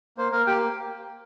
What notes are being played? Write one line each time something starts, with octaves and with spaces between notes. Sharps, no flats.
A#3 C5
A#3 A#4
A#3 G4 G5